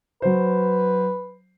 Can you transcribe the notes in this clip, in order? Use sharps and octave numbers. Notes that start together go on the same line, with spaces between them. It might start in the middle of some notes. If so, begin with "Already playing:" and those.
F#3 B4 C5